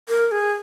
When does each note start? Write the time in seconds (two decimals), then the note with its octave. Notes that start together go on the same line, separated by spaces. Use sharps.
0.09 A#4
0.31 G#4